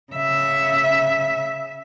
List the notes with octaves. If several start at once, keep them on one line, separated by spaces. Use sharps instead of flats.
C#3 E5